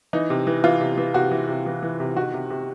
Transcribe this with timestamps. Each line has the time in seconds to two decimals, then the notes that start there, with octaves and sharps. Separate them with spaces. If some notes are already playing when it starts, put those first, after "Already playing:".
0.13 E3 D#4
0.30 C3
0.47 E3
0.64 E3 F4
0.81 C3
0.98 E3
1.14 C3 F#4
1.31 E3
1.48 C3
1.66 E3
1.83 E3
2.00 C3
2.17 D#3 F#4
2.34 C3
2.50 C3